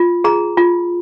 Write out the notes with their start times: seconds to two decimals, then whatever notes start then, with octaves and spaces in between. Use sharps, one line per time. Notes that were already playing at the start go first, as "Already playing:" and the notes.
Already playing: F4
0.24 G#4 A#5
0.57 F4